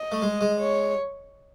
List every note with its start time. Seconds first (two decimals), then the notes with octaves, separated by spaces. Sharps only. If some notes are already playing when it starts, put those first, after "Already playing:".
Already playing: D#5
0.12 A3
0.22 G#3
0.41 G#3
0.60 C#5